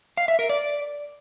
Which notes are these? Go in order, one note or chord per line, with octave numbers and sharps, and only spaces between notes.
F5
E5
A#4
D5